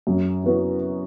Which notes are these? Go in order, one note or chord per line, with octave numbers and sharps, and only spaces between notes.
F#2
E3 B3 F#4